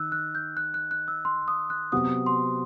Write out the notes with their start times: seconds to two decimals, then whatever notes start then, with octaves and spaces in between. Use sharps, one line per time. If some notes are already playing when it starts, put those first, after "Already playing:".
Already playing: D#3 E6 F#6
0.12 F#6
0.35 G6
0.57 F#6
0.74 F#6
0.91 F#6
1.08 E6
1.25 C6
1.48 D#6
1.70 F#6
1.92 C3 F#3 B3 F#4 D#6
2.26 C6